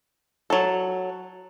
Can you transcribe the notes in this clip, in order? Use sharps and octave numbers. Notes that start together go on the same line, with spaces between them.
F#3 A4